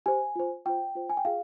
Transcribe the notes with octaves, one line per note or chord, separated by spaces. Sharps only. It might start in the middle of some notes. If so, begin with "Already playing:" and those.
G4 C5 G#5
F4 C5
F4 C5 G5
F4 C5
G#5
G5
F4 G#4 F5